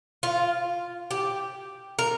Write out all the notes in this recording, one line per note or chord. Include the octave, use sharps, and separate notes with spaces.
F4
G4
A#4